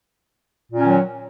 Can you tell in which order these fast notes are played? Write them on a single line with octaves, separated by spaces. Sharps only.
A#2 C#4 D#3 F#3